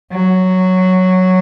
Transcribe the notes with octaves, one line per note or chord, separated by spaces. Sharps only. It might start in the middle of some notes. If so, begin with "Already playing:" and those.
F#3